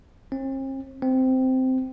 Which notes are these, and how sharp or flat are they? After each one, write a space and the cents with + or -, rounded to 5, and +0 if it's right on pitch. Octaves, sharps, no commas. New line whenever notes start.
C4 +45
C4 -10